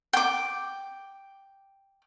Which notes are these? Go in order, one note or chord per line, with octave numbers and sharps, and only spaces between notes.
G5 D6